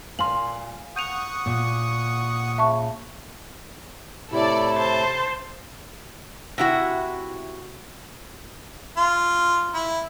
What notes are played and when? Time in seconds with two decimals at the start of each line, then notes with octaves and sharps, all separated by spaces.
0.19 A#2 F5 G#5 C6 F#7
0.96 F#5 C#6 D#6 G6 D#7 F7
1.46 A#2
2.58 C#3 E5 A5 C#6
4.32 A2 C3 E4 A4 D5
4.76 C5 A5
6.58 C3 E4 F#4
8.97 F4
9.74 E4